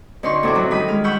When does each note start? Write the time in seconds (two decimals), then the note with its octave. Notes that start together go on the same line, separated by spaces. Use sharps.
0.23 D2 C#4 D#4 C6 C#6
0.43 A2 C3 E4 F#4 D6
0.55 F#3 C#4 F#4
0.71 D#3 G3 B5 D#6
0.88 G#3 F6
1.04 F#5 B5 C#6 E6 G6